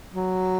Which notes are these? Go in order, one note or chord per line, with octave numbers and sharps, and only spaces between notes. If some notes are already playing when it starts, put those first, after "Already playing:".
F#3